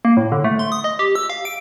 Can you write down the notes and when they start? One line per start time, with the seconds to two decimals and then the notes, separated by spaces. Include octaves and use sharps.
0.05 A#3
0.17 A2
0.32 D3
0.44 A3
0.59 C6
0.72 D#6
0.84 D#5
0.99 G4
1.16 E6
1.30 F5
1.45 D7